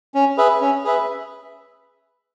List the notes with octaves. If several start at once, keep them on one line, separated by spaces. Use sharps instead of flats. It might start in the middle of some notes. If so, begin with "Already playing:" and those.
C#4
G#4 B4 E5
C#4
G#4 B4 E5